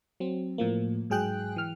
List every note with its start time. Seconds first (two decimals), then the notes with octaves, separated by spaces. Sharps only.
0.20 F#3 C4
0.58 A2 F3 A#3
1.10 G#2 F#3 G#4 G5 F#6
1.56 E3 F6